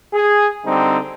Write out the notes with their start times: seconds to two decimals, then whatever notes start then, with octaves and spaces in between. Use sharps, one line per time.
0.13 G#4
0.64 D3 G3 C4 D#4